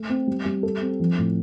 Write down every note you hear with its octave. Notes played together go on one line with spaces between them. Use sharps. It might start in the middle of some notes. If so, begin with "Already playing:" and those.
Already playing: A3
C4
G3
G3
A4
C4
F3
A2